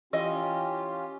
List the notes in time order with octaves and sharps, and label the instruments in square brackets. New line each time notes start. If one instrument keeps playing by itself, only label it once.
[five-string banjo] E3 D#5 [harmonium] C#4 F4 G4